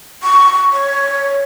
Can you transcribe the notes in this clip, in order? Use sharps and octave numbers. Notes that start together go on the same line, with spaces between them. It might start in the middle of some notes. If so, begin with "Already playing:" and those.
C#6
C#5